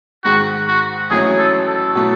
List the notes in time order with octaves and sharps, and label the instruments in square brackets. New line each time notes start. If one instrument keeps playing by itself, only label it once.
[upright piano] G#2 D#3 G#3 [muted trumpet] F#4
[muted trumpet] F#4
[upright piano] A1 A2 F#3 A3 C#4 [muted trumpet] G#4
[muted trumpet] A4
A4
[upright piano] B2 F#3 A3 E4